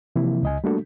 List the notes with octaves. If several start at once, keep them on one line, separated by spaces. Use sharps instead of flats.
C3 E3 F3 A#3 E4
C#2 D#5 G#5
G3 A3 A#3 D4 F#4 A4